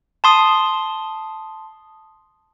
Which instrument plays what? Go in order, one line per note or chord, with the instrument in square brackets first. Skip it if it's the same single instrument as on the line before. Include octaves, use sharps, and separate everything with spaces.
[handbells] A5 C6 D#6